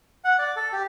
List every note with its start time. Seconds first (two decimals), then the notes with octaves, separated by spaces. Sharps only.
0.25 F#5
0.39 D5
0.56 A4
0.73 G4